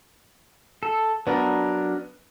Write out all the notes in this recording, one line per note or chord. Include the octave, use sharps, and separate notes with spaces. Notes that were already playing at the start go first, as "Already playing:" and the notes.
A4
F#3 B3 D4 A#4